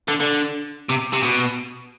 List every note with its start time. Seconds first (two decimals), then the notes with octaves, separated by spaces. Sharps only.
0.08 D3
0.20 D3
0.89 C3
1.13 C3
1.23 B2